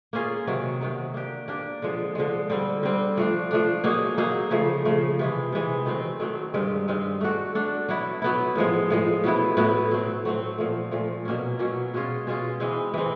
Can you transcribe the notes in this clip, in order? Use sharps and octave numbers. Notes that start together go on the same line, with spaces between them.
A#3 C#4 F4 G#4
C3 D#3 F#3
C3 D#3 F#3
A#3 D4 G4
A#3 D4 G4
D3 F3 G#3
D3 F3 G#3
D3 G3 C4
D3 G3 C4
F3 A3 D4
F3 A3 D4
F#3 A#3 D#4 G#4
F#3 A#3 D#4 G#4
C#3 F3 A3
C#3 F3 A3
C3 E3 G#3
C3 E3 G#3
D#3 F#3 A3 C4
D#3 F#3 A3 C4
G2 D#3 G#3 C4
G2 D#3 G#3 C4
A3 D4 F#4 A4
A3 D4 F#4 A4
F#3 B3 E4
F#3 B3 E4
A2 F3 G#3
A2 F3 G#3
A2 F#3 B3 E4
A2 F#3 B3 E4
F#3 A3 C4
F#3 A3 C4
A#2 F3 A3
A#2 F3 A3
B2 F#3 A#3 C#4
B2 F#3 A#3 C#4
B2 G#3 C#4 F4
B2 G#3 C#4 F4
E3 G#3 C4
E3 G#3 C4